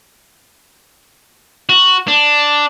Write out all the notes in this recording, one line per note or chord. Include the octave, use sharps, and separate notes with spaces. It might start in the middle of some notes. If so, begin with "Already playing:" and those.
F#4
D4